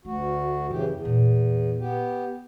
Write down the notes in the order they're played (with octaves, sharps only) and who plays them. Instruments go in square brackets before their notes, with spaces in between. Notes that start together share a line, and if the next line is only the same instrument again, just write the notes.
[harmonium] D2 F#4 [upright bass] A3
[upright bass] F#2 [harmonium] C#3 E3 G4
[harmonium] E2
[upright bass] A#2
[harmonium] B3 G4